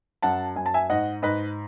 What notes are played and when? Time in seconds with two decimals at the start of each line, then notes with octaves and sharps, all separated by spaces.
0.22 F#2 F#5 A5
0.56 F#2 G#5
0.66 A5
0.74 E5 G#5
0.90 G#2 D#5 F#5
1.22 G#2 B4 D#5